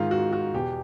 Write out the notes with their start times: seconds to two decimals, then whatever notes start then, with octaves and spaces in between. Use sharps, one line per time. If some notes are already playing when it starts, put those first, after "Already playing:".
Already playing: G#2 D#3 F4
0.11 F#4
0.33 F#4
0.53 E2 B2 G4